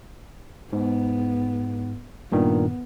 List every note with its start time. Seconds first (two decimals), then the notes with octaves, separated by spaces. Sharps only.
0.73 G#2 B3
2.32 G2 A#2 D#3 B3